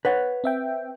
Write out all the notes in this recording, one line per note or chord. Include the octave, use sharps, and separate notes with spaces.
B4 C#5 F#5
C4 E5 G5